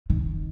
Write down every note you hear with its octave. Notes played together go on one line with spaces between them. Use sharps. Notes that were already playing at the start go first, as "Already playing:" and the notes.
D#3